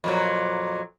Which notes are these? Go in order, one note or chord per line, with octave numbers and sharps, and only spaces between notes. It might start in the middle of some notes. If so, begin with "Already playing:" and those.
F2 A#2 F#3